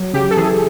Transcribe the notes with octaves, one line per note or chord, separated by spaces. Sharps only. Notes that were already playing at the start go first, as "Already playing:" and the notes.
Already playing: F#3
C#3 G4
A4
E3 G#4